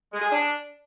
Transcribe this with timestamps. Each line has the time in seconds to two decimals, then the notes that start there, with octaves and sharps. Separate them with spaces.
0.13 G#3
0.22 G#4
0.31 D4